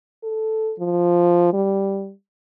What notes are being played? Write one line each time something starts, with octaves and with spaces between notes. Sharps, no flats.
A4
F3
G3